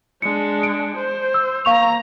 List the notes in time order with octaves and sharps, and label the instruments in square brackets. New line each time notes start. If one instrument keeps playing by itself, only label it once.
[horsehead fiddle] G#3 D4 [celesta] C#7
[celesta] C#7 D7
[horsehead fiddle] C5
[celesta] E6
[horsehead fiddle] A#3 A#5 [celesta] F5 C#6 F7